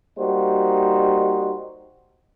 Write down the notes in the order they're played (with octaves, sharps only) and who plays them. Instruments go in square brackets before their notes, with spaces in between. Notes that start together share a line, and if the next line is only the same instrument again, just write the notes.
[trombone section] G3 A#3 D#4 F#4 C5